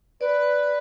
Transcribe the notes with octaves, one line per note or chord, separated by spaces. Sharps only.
B4 D5